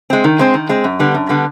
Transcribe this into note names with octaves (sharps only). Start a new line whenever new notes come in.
G#3 C4
D#3
G#3 C4
D#3
G#3 C4
F#2
D3 G3 B3
F#2
D3 G3 B3